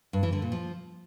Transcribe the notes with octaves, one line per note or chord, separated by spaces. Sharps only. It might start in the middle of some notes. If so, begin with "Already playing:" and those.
G2
E3
D3
A#2
F3